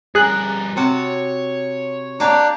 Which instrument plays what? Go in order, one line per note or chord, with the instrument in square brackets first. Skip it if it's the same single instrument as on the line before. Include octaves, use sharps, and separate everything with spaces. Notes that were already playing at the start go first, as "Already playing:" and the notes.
[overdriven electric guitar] G2 A#4 [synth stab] G#4 F#6
[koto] C3 F#4 A5 [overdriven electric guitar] C#5
[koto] A#3 G4 F5 [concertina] D4